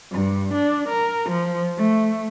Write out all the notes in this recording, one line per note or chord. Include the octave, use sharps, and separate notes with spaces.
G2
D4
A#4
F3
A3